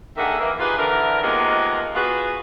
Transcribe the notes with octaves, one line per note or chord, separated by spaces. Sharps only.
D3 D#3 A#3 G#4 E5 F#5
D#3 E3 A#3
D#4 F4 G4 G#4 B4
D3 E3 A#4
C3 D#3 F3 G#3 A#3 B3
B3 F4 F#4 G#4 B4